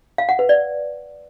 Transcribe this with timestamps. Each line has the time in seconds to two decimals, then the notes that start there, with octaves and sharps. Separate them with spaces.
0.18 F5
0.29 F#5
0.39 B4
0.49 D5